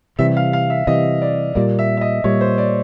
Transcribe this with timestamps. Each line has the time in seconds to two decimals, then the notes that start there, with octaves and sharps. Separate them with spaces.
0.19 C3 E3 G3 E5
0.37 F5
0.53 F5
0.70 E5
0.87 C3 E3 G3 D#5
1.22 D5
1.55 A#2 G3 A#3 D5
1.79 E5
1.97 E5
2.01 D#5
2.24 A#2 G3 A#3 C#5
2.41 C5
2.58 D5